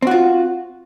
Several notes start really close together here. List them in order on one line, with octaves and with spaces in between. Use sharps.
C4 F#4 F4